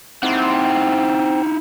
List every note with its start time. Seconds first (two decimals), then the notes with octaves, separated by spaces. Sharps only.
0.23 C4 D#4 E4 F#5